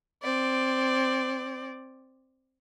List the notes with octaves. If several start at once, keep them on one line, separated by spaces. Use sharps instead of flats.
C4 D5